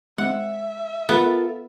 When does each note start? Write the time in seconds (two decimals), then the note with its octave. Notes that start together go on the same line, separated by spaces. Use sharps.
0.18 G#3 A#3 C4 E5 F#5
1.09 B3 F4 A4 A#4